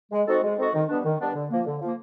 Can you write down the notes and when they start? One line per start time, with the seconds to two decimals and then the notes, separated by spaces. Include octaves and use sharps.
0.12 G#3
0.27 C4 D#4 F#4 A4
0.43 G#3
0.58 C4 D#4 F#4 A4
0.74 D#3
0.88 G3 B3 D4
1.05 D#3
1.20 G3 B3 D4
1.35 D3
1.51 F3 A#3
1.66 D3
1.81 F3 A#3